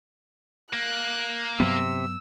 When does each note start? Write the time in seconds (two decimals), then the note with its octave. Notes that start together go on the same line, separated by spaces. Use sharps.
0.73 A#3 F#6
1.60 G2 C3 F#3 B3 E6